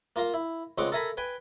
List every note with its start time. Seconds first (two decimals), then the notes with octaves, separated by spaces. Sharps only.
0.16 A#3 F4 A#4 F5
0.34 E4
0.78 C#2 G#3 C4 F#5 D6
0.92 A4 A#4 E5 G#5 A#5 B5
1.17 B4 G5 G#5